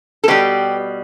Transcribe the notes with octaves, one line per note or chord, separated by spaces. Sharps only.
A4
B2 G3 G4 B4